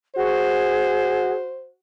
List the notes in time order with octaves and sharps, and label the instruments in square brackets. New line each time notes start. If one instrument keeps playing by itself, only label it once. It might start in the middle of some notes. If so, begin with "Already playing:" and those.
[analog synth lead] F#4 [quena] G#4 [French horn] C5